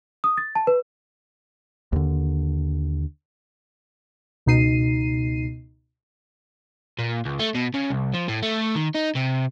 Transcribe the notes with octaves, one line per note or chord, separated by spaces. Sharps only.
D#6
A6
A5
B4
D#2 D3
C#2 B2 D#4 C7 D#7
A#2
C#2
A3
B2
C#3
C2
F3
A2
A3
D#3
D#4
C3